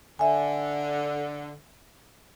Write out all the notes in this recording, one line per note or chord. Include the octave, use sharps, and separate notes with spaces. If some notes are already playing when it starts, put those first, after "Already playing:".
D3 E5 G#5